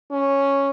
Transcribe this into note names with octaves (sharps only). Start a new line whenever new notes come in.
C#4